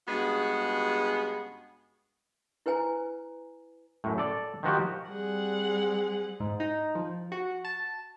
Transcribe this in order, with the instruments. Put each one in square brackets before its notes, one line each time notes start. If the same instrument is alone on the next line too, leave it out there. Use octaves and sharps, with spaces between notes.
[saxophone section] G2 C#3 G#3 B3 F#4 G#4
[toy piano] E4 B4 C5 G#5 A#5
[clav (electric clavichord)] F#2 A2
A4 D5
D#3 F3 F#4 G4
[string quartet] G3 C4 G#4 F#5
[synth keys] G#2
D#4
F3
F#4
A5